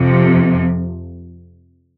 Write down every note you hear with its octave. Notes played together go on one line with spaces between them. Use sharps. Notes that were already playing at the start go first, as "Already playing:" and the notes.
Already playing: F2 C3 F3